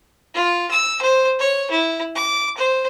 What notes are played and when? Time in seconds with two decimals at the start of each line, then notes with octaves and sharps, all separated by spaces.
0.34 F4
0.71 E6
1.02 C5
1.40 C#5
1.71 E4
2.15 D6
2.57 C5